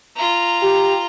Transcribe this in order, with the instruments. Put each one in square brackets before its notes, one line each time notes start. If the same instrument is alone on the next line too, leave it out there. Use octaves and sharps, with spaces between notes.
[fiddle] F4 A#5
[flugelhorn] G4